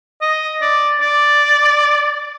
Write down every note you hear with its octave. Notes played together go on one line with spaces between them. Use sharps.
D#5
D5
D5